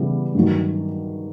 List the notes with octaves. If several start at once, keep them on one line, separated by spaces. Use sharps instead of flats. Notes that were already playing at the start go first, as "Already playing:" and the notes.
Already playing: C#3 E3 G3 B3
G2 D#3 F#3